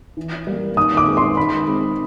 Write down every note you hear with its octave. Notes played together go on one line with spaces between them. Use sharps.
E3
G3 A#3
D#3 D#6
D6
G#3 C4
C6
D#3 B5
G#3 C4